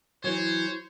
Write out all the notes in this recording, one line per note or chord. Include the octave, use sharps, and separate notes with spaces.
E3 F#3 C5 C#5